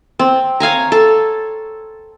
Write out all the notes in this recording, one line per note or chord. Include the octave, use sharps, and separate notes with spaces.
C4
C#5 F5 G#5 A#5
A4